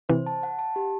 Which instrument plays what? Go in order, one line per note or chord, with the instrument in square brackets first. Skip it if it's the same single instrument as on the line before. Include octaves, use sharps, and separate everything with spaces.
[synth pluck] C3 E3 [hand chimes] C5
[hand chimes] A5
F#5
A5
G4